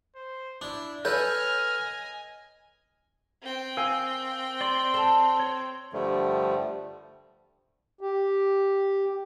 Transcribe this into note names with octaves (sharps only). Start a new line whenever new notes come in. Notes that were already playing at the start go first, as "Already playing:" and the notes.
C5
D4 E4
A4 B4 C#5 D#5 G#5 F6
C4 G5
A#4 F5 G#5 E6
D5 C6 F#7 G7
A4
C#5
G2 D3 F3 G3 A3
G4